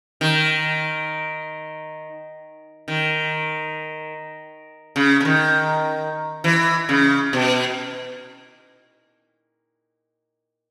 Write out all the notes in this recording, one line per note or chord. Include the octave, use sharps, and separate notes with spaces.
D#3
D#3
C#3
C#3
D#3
E3
C#3
B2